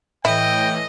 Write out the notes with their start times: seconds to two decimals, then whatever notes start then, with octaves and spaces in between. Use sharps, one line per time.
0.25 A2 E3 E4 D#5 G5